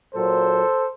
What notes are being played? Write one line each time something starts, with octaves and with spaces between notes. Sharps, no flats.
A#2 F#3 A#3 A4 C5